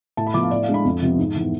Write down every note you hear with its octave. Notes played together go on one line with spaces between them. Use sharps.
A2 A5
B5
F3 B3 D6
F5
A2 D5
F5
G#3 D4
B5
F2
C3 F3 B3
G#2
E3 B3